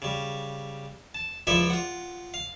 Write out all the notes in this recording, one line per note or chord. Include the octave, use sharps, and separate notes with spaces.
C#3 G3
A5
C#2 F3 E4 A4 D5 E5
F4 F#5
F5